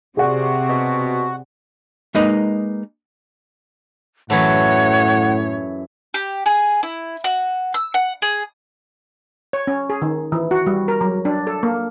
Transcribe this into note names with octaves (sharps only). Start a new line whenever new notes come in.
C3 F#4 G#4 D5 F#5
B2
G#3 A#3 D#4 B4 D#5
F#2 A2 E3 A3 C#5 F#5
G4
G#4
E4
F#4
E6
F#5
G#4
C#5
C#4
G#4
D#3
E3
F#4
G3
A#4
F#3
D4
A4
A#3